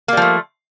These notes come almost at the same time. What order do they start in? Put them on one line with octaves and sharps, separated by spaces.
A#3 G3 F3 A3